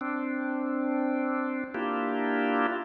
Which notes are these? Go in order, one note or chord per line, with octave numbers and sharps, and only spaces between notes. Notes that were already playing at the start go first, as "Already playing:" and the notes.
C4 D4
A#3 D4 E4 F4 G4